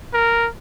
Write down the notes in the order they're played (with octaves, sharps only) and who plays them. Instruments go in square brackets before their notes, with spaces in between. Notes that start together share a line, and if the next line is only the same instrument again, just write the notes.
[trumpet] A#4